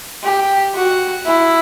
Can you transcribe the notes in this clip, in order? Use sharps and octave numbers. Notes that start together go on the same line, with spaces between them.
G4
F#4
E4